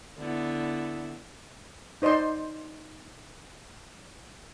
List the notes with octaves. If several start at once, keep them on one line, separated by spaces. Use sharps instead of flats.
D3 B3 E4
D#4 C5 D5 D#5 C6